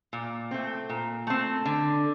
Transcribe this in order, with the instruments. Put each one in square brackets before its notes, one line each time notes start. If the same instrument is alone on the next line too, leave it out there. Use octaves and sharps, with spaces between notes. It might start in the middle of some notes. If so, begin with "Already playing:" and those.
[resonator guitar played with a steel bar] A#2
A3 C4
A#2
A3 C4
D3